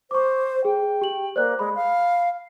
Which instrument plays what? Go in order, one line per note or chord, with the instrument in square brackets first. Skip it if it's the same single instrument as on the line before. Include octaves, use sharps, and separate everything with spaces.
[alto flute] C5 [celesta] C#6 D6
[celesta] G#4 [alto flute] G5
[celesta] G4 F#7
[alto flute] A#3 [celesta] C5 D5 F#6
[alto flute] G#3 [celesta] B5
[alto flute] F5